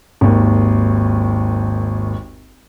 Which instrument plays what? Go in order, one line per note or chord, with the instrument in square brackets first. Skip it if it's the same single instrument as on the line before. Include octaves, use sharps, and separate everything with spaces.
[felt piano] G#1 D#2